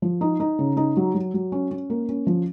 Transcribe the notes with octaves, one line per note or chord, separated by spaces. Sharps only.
F3
D#4
D#4
C#3
D#4
F#3
F#3
F#3
C#4
C#4
A#3
C#4
F3